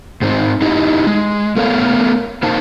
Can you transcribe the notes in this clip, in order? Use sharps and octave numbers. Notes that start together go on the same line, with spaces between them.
G#2 C4 D#4
D#4 E4 G4 D#5
G#3
A3 B3 A4 A#4 C#5 F5
A#3 D#4 A#4 C5 F5 A5